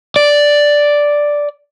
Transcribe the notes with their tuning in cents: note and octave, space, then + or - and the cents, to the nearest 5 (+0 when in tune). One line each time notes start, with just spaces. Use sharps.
D5 +0